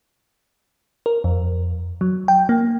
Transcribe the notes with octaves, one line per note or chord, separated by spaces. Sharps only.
A#4
F2
F#3
G5
A#3